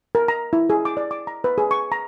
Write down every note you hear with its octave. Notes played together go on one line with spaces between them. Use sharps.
A#4
A#5
E4
G#4
D6
D5
D6
A#5
B4
G#4
C#6
A#5